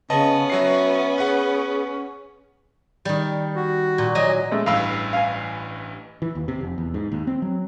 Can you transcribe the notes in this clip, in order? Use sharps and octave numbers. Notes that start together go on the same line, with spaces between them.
C#3 B3 C#4 D#5 A5
F#3 F#4 E5 C7
G#4 B4 F#5 C#6
D#3 G3
F#4
A#2
F#3 D#5 G#5 A#5
G#3 A3
A1 G2 E3 F5 B5 E6
F5 G#5
E3
D#2
C3
F1
E2
G#2
D#2
C4
F#3